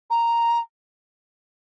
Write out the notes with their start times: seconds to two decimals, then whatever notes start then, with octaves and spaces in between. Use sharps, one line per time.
0.10 A#5